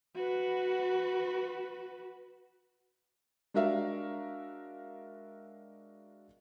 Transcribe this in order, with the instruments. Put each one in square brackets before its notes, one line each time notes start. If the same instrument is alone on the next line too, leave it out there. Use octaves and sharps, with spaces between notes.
[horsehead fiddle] F#4 B4
[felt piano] G#3 D4 F#4 A#4 E5 F5